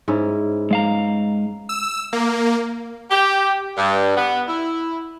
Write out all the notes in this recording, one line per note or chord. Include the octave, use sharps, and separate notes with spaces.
G#2 C#4 E4
G#3 F5 A#5
E6
A#3
G4
G2
B3
E4